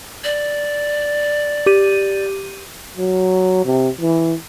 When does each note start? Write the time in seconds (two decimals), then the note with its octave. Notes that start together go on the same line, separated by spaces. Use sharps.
0.24 D5
1.66 G4 D#7
2.97 F#3
3.65 C3
4.01 E3